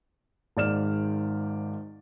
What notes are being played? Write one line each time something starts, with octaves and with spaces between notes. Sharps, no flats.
G#1 G#2 D5 F6 E7